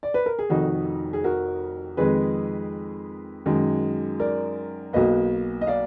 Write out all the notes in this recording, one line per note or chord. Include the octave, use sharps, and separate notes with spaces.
D5
B4
A#4
G#4
F1 F2 D#3 D#4 F#4
G#4
F#4 A#4
F2 D#3 G#3 G#4 B4
F#2 D#3 G#3
A#4 D5
B1 B2 A#3 B4 D#5
D#5
D5 F5